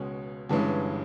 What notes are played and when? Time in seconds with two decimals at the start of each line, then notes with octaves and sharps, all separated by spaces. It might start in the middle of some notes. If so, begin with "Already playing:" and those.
Already playing: C#2 B2 G#3 C#4
0.49 G1 G2 E3 G#3 C#4